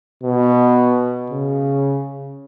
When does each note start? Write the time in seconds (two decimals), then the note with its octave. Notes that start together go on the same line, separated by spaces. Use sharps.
0.23 B2
1.30 C#3